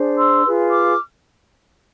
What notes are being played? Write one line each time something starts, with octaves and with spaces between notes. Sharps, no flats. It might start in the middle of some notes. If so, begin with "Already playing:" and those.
Already playing: D4 G#4 C5
C6 E6
F4 G#4 B4
D6 F6